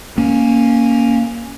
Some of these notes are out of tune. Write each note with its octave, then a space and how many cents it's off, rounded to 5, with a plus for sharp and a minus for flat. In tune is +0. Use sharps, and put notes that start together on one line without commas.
A#3 +0 C#4 +0